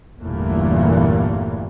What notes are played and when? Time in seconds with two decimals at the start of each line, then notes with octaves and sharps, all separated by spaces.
0.22 G1 E2 A#2 E3 A3 A#3